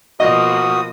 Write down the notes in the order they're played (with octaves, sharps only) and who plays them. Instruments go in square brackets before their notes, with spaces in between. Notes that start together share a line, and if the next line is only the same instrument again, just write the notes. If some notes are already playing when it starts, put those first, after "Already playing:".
[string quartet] B2 F3 A#3 [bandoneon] F#4 D#6 [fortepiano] D#5